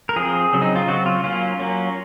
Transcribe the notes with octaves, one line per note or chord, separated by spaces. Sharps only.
A#4
F3 C4 G#4
C#3 F#3 C4
D#4
F4
C#3 F#3 C4 F#4
F4
F#3 A#3 C#4 F4
F#3 A#3 C#4